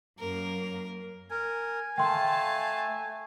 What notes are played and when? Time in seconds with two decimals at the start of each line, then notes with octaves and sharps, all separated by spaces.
0.19 F#2 A#3 A#4
1.31 A#4 G#5
1.98 A3 F5 G5 A5 C6